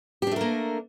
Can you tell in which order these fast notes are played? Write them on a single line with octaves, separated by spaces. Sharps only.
G4 D4 A3 A#4 A#3